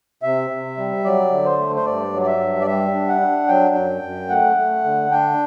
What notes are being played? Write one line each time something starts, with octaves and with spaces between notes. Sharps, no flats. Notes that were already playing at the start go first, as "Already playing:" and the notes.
C3 E5
C3
G3
F#3 D5
D3
C5
A3
C5
G2 D5
F#3
D5
E5
G2
D5
G3 E5
D4
F#5
D4
F#3 G5
F#2
F#2
A3 F#5
A3
D3
D4 G5